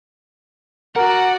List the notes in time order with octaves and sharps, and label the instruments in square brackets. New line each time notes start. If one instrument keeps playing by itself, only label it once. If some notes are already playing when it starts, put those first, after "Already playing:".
[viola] F#4 D5 [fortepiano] A#4 [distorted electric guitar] F#5